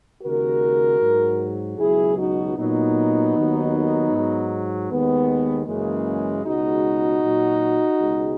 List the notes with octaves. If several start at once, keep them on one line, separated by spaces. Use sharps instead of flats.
D#2 C#3 G#3 F#4 A#4
G#2 F#3
C#2 B2 F#3 E4 G#4
D#4 F#4
A#2 F#3 B3 D#4
D#2 D#3 F#3
G#2 F#3
D#2 D#3 G#3 B3
F#2 C#3 E3 G#3 A#3
C#2 B2 G#3 D#4 F#4
A#2 F#3
C#2 B2 G#3